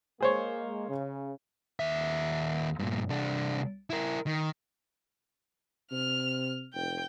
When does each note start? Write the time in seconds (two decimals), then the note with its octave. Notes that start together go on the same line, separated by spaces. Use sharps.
0.21 G#3 A#3 G#4 C5 C#5
0.88 C#3
1.80 D#2 E5
2.79 G2 A#2
3.09 C2 D4
3.90 E4 A#4
4.27 D#3
5.92 C3 F6
6.74 F1 G5